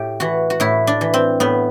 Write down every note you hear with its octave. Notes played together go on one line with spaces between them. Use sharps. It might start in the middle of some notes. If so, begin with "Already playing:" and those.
Already playing: A2 G4
E3 F#4
F#4
A2 E4
D4
E3
C4
A2 B3